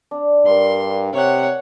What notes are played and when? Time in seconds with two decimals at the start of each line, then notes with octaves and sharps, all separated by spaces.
0.11 D4
0.46 G2 A#4 C6
1.13 C3 C#5 F#5